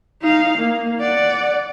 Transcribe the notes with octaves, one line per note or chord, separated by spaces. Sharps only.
D#4 F5
A#3
D5 F#5